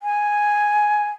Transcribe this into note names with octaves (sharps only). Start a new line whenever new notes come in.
G#5